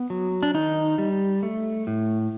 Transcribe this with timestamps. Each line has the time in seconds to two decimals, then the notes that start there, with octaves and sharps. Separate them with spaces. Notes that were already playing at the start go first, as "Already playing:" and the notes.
Already playing: B3
0.10 F#3
0.43 D4
0.54 D#3 D#4
0.98 G3
1.43 A3
1.87 A2